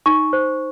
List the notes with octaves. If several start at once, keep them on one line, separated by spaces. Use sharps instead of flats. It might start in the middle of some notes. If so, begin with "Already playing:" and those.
D#4 C#6
C5